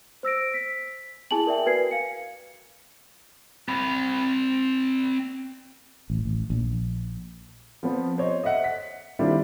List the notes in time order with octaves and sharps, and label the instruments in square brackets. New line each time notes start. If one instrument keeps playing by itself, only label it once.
[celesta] C5 E6 A#6 D7
B6
E4 G#4 G#5 A5 F#7
A#4 D5 E5 G5
F#4 A#4 B4 G#5 G#6 C7
F5 C#7
[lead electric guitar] C4 B5
[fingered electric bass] A1
A1
A#1
[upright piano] F3 B3 C4
C5 C#5 D#5
D#5 E5 F#5
B6
D#3 G3 C4 D4 E4 F4